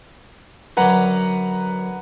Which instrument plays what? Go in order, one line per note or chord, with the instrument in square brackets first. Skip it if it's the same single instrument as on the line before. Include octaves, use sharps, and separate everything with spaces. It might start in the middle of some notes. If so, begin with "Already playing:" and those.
[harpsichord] F#2 D3 [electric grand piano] B4 F#5 A#5